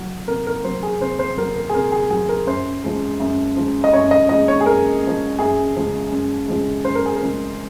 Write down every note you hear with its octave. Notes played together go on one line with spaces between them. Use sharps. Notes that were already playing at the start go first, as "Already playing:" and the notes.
Already playing: C3 F#3
C3 A#4
A#4
F#3 C5
G#4
C3 C5
C5
F#3 A#4
A#4
G#4
C3 A#4
G#4
F#3 G#4
A#4
F#2 C5
F3 G#3
F#2
F3 G#3
D#5
F#2 C#5
D#5
F3 G#3 D#5
C#5
G#4
F#2 A#4
F3 G#3
F#2 G#4
C#3 F3 G#3
F#2
C#3 F3 G#3
F#2 C5
A#4
G#4
A#4
C#3 F3 G#3